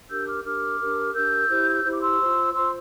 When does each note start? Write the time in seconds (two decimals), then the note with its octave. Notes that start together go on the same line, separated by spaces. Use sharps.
0.08 D4 G4 A#4 E6 G6
0.26 D6 F6
0.44 D4 G4 A#4 D6 F6
0.80 D4 G4 A#4
1.13 D4 G4 A#4 E6 G6
1.48 E4 G4 C5
1.84 E4 G4 C5
1.94 D6
2.01 C6 E6
2.19 F4 C5
2.54 F4 C5 C6 E6